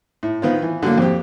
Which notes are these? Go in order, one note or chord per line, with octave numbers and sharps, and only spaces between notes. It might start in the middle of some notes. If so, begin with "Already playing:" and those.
A2
D#3 B3 C4 F4
E3
D3 F#3 A#3
F2 C4 G4